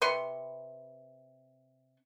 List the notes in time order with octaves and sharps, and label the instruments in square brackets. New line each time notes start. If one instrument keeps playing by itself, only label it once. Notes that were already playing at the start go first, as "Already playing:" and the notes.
[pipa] C3 B4 C6 C#6